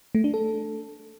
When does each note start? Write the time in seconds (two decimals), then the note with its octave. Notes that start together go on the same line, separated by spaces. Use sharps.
0.15 A3
0.24 D4
0.34 A4